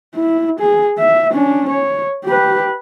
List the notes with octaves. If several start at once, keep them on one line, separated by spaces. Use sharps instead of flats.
E4
G#4
E5
C#4 D4
C#5
G4 B4